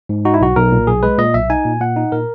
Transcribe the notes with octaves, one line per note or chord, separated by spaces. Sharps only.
G#2
D#4 F#4
E4
B1 F#4
B1 A#4
A#2
B1 G#4
G#3 B4
A#2 D#5
B1 E5
D#4 G#5
A#2
A#2 F#5
D#4
A#2 A#4